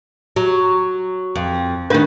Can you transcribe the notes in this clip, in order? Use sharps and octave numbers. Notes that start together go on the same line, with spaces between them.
F#3
F2
D#3 A3 D4 A#4 B4